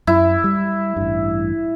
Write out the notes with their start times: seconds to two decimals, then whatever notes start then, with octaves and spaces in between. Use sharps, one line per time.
0.07 F#2 E4
0.44 G3
0.96 A1 G2